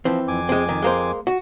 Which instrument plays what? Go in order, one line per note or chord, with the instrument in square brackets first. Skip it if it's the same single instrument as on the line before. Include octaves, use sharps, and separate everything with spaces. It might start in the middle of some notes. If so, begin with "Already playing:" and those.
[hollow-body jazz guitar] E3 C4 [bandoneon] F3
[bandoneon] F2 G#5 D6
[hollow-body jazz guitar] G#3 C4
D#3
G#3 A#3 C5
F#4